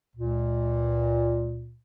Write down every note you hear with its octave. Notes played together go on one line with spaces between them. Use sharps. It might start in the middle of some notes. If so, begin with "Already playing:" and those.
C#2 A#2